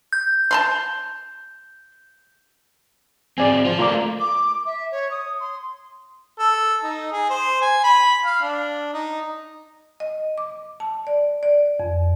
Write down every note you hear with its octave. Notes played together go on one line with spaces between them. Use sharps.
G6
A5 A#5 C6
C4 G#4 D5 G#5
F4 C5
A3 F4 A#4 D5 D6
D6
E5
C#5
D#6
C6
A4
D#4
G#4
C5
G#5
B5
F5
D4
D#4
D#5
D6
A5
D5
D5
F2